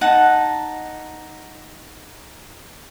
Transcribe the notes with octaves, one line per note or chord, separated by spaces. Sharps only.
D#4 F#5 A5